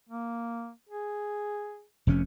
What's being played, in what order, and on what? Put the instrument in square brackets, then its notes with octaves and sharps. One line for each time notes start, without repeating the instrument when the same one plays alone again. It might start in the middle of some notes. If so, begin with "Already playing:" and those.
[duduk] A#3
G#4
[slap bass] F1 C3 C#4